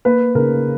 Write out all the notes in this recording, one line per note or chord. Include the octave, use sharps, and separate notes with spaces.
A#3 B4
C#3 A#4